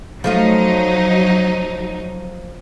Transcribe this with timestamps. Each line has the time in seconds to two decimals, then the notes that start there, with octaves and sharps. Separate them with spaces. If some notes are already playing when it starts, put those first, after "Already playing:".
0.24 F3 F#3 A3 D#4 F4